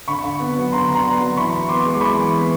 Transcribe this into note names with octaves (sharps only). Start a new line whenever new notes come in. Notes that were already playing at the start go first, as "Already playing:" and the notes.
D3 B5 C#6
D3
B3
F#3
D3 A#5 C6
D3
A#5 C6
B3
F#3
E3 B5 C#6
E3
B3 C6 D6
G#3
D6
E3 B5 C#6
E3
B3